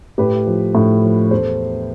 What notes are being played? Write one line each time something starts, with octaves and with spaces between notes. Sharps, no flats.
A2 G4 B4
F3
A2
F3
E2 A4 C5